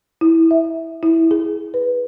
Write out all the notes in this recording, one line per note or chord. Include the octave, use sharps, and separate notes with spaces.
E4
E5
E4
G#4
B4